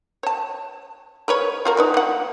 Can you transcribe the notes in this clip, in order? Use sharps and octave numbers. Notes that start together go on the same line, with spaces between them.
C#5 A5
A#4 B4 C#5
F4 F#4 A#4
D#4 B4 D5
A#3 F#5